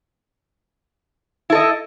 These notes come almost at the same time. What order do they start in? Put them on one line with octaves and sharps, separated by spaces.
E4 A4 D#5